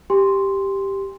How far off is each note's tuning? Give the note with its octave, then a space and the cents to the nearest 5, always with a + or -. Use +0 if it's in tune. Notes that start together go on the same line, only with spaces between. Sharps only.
G4 +0 G#5 -40 C6 +0